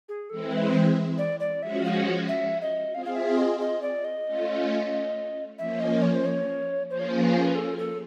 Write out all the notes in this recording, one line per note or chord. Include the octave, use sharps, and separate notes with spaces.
G#4
E3 G#3 C4 E4 A4
B4
C5
D5
D5
F3 G#3 C#4 F#4 E5
F5
E5
D#5
C4 F4 G#4 F5
F5
E5
D#5
D#5
D5
D#5
A3 C#4 F4
F3 A#3 C#4 E5
D#5
C#5
C5
C#5
F3 A#3 C#4 F4 G#4 C5
C#5
C5
B4
C5
B4
A4
A4